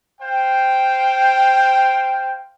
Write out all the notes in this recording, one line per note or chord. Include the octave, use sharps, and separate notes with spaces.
C5 F5 G5